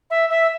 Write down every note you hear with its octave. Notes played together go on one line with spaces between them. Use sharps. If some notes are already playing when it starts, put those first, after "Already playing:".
E5
E5